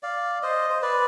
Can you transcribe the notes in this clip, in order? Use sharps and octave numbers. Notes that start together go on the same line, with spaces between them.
D5 F5
C5 D#5
C5
B4 D5